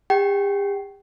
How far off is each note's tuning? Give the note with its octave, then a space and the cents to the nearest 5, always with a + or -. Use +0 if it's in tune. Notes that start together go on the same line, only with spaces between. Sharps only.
G4 +40 G5 -30